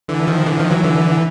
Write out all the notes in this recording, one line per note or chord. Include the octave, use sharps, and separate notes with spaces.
D3 E3
D#3 F3
D3 E3
D#3 F3
E3 F#3
D3 E3